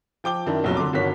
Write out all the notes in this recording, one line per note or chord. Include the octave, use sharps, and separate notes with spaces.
F3 G5 D6 G7
F#2 D#3 D4 E4
F1 A#1 B2 F#3
D3 C6 D6
G1 D3 D#3 F#4 C#5 B6